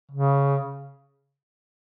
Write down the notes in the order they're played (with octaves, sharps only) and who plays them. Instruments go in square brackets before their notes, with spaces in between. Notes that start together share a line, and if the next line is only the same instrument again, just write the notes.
[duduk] C#3